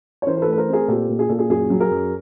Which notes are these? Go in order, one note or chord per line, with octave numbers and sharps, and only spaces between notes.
C#5
E3 A#4 C5
C5
A4 B4
A3
B4
A#4 C5
C4
G#4 A#4
A#2 G4 A4
A#2
G#4
A#2 A4
G#4
F#2 G#4
F#3
G#4 A#4
F#2